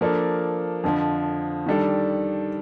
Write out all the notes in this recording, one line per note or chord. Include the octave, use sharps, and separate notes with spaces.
F3 A#3 D4 A4
F2 D3 F3
D#3 G3 D4 A4